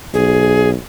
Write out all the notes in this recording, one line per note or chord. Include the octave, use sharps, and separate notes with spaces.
B1 G#4